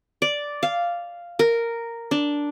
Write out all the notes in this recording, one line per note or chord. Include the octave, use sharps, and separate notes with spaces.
D5
F5
A#4
D4